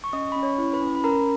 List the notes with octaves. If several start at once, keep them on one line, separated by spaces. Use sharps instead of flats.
C#6
C#4 D#5 D#6
C#4 B5
C#5 C#6
E4
B4 B5
C#4
B5
C#4 A#4 A#5